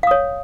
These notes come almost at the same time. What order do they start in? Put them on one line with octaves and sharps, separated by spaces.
F5 D#6 C#5